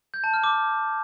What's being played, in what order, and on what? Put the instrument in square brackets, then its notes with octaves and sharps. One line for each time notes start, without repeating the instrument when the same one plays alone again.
[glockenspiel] G6
A5
F6
D6